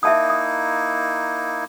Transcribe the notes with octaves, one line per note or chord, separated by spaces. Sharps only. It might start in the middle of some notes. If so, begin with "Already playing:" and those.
A#3 D#4 E4 E5 A5 D#6
D#6